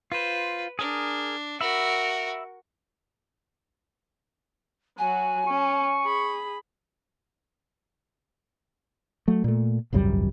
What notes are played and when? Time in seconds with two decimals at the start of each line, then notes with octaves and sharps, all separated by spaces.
0.12 F4 B4 C5
0.79 D4 G#4 A#4
1.61 F#4 A#4 E5 B5
4.98 F#3 F#4 G#5
5.47 C#4 C#6
6.04 G#4 B5
9.28 F#3 A3
9.44 A#2 A3
9.93 G#1 C#2 F#2 G3